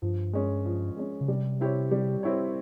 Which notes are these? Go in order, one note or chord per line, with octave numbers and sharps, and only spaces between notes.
G2 F3
G#3 C#4
F3
G#3 C#4
C#3
C3 G3
C4 E4 G4 C#5
G3
C4 E4 G4 C#5